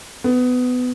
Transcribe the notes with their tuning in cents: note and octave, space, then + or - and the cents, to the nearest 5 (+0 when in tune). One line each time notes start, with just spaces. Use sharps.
B3 +20